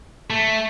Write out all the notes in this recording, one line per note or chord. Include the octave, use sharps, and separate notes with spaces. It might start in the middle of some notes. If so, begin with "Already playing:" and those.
A3